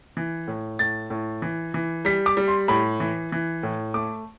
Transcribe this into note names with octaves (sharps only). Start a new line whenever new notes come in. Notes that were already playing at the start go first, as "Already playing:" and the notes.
E3
A2
A2 A6
A2
E3
E3
G3 B6
D6
G3
C6
A2 B5
E3
E3
A2
A3 D6